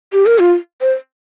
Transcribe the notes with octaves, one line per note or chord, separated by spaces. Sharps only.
G4
A#4
F4
C5